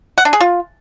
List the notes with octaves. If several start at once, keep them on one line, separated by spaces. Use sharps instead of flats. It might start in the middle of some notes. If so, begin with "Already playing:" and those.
F#5
D4
G#4
F4